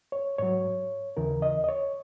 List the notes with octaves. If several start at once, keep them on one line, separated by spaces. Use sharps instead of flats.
C#5
G#2 F#3 C#5
D#2 C#3 E3 A#4
D#5
D#5
C#5